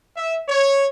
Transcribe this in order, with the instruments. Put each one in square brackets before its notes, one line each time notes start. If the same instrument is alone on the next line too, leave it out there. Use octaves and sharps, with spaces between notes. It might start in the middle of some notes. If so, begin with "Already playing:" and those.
[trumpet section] E5
C#5